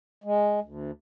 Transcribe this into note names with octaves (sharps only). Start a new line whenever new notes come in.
G#3
D2